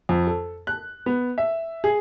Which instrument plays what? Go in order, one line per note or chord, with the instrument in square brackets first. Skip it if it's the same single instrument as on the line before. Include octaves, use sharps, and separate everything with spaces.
[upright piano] F2
A4
F#6
B3
E5
G#4